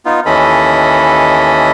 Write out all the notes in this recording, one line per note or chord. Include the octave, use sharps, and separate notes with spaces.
B3 D#4 F4
D#2 E3 C#4 A4 D#5 B5